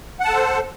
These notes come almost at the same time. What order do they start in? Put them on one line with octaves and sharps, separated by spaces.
F#5 A5 A4 C5